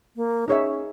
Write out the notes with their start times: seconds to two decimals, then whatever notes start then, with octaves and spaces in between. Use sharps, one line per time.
0.16 A#3
0.48 C#4 D#4 G#4 C#5 E5